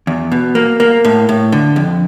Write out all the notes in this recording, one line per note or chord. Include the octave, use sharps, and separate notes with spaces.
E2
B2
A#3
A#3
A2
A2
D3
F2